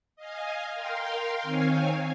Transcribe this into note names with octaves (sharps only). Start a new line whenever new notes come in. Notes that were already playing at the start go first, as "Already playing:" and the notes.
D#5 F5 G#5
A#4 F5 G5 C6
D#3 C4 C#5 F5 G#5